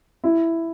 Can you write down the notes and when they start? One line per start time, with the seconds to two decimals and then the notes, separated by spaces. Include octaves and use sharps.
0.24 E4